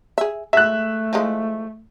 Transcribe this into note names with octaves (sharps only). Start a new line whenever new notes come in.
G#4 E5
G#3 A3 E5 F#6
F3 G#3 E4